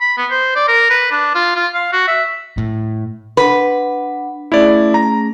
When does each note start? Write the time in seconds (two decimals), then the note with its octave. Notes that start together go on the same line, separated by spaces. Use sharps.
0.01 B5
0.17 B3
0.30 C5
0.56 D5
0.68 A#4
0.90 B4
1.11 D4
1.35 F4
1.56 F4
1.74 F5
1.93 F#4
2.08 E5
2.58 A2
3.37 D4 B4 F#5
4.52 A3 C#4 E4 G#4 D5
4.94 A#5